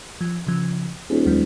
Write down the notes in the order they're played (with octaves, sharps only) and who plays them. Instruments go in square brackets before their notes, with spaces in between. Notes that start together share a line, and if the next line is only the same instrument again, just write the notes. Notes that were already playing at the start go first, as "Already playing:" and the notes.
[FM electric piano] F3
C#3 F3
[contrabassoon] D#1 [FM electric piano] G#4
[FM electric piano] D#2 F#3 G#3